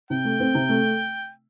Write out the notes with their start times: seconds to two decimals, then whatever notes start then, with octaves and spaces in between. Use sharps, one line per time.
0.10 C3 G5
0.25 A3
0.40 C4
0.55 C3
0.69 A3